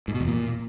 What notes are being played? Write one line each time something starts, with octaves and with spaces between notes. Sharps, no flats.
G#2
B2
E2
A#2